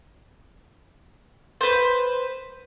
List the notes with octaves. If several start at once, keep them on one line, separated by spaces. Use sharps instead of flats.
B4 C5